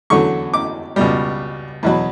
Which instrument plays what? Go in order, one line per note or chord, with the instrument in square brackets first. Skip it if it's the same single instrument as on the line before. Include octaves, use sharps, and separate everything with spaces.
[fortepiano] E2 D3 F#3 A3 C#6
D6
C#2 B2 G3
E2 B2 F#3